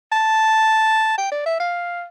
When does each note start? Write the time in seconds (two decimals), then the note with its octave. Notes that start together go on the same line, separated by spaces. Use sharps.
0.12 A5
1.18 G5
1.31 D5
1.46 E5
1.60 F5